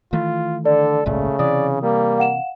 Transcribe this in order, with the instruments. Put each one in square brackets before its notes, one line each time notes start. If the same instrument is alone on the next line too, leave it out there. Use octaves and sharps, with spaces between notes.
[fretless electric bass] D#3 E3 A3 [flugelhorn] F4
[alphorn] D3 [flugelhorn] A4 [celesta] D5
[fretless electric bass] G#1 C#2 A#2 [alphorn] C#3 [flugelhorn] A3
[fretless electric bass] C3 E3 [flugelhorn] D5 [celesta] D#6
[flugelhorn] G3 [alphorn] A#3
[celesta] F5 F#5 E7